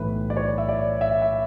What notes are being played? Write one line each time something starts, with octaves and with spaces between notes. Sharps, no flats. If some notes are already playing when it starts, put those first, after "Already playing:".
Already playing: B1 A2 E3 A3 B4
D5
C#5
E5
D5
E5
E5